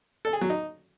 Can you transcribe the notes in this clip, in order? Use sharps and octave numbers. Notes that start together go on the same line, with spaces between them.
A4
G#4
F#3
D#4